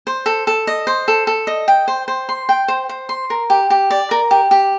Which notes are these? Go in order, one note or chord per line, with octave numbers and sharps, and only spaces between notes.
C5
A4
A4
D#5
C5
A4
A4
D#5
G5
C5
C5
C6
G5
C5
C5
C6
A#4
G4
G4
D5
A#4
G4
G4